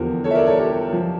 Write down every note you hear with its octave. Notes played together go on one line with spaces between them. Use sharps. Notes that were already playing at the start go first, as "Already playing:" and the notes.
Already playing: E2 D3 F3 G4 A#4
A4 C#5
E5
A#4 D5
A4 C#5
G4 A#4
F3